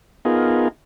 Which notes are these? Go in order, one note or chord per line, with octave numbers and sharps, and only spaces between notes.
B3 D#4 F4 G#4 A#4